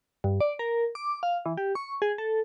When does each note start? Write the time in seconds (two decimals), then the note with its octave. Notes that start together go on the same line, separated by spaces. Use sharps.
0.24 G2
0.40 D5
0.59 A#4
0.95 D6
1.23 F5
1.46 E3
1.57 G4
1.75 C#6
2.02 G#4
2.18 A4